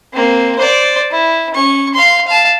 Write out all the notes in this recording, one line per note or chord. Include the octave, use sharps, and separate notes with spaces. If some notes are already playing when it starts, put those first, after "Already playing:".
A#3 C4
C5 D5
E4
C#4 C#6
F5 C6
F5 A5